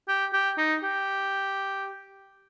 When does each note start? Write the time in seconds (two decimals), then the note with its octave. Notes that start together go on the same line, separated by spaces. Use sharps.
0.08 G4
0.33 G4
0.58 D#4
0.83 G4